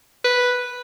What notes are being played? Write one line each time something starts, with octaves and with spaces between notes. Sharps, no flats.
B4